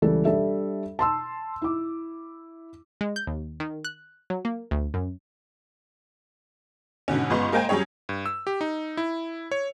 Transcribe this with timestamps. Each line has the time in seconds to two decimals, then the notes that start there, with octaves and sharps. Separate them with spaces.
0.02 C#2 E3 G3 A4
0.25 G3 D4 A4 E5
0.99 A5 C6 E6
1.62 E4 D6
3.01 G#3
3.16 G6
3.27 D#2
3.60 D#3
3.85 F#6
4.30 F#3
4.45 A#3
4.71 D2
4.94 F#2
7.08 G#2 B2 D3 C#4
7.30 G1 G#3 B3 C6 C#6
7.52 G#3 A#3 A#4 C5 G5 G#5
7.69 F#3 G3 C#4 G#4 C#5
8.09 G2
8.26 E6
8.47 G4
8.61 D#4
8.97 E4
9.51 C#5